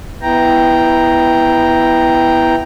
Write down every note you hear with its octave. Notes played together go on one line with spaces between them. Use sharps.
B3 E4 G5 A#5